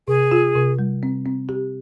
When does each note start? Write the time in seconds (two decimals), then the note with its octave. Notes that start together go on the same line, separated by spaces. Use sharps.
0.08 C3 G#4
0.32 F4
0.55 C3
0.79 G3
1.03 C4
1.26 C4
1.49 G4